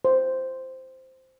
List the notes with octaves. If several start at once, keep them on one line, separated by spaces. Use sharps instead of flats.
C5